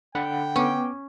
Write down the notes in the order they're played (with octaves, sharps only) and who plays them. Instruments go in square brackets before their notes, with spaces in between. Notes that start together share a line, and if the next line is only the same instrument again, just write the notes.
[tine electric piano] D3 F#5 B5 [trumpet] G5
[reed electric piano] B3 D6 [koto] C#4